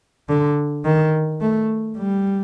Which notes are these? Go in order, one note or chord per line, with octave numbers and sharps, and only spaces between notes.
D3
D#3
A3
G3